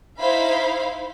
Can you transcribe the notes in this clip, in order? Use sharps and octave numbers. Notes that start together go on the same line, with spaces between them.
D#4 E4 C5 F5 B5